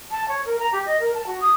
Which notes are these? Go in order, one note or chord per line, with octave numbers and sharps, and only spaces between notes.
A5
C#5
A#4
A#5
G4
D#5
A#4
A5
F#4
D#6